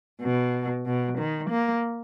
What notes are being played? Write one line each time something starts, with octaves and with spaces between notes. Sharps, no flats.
B2
B2
D#3
A#3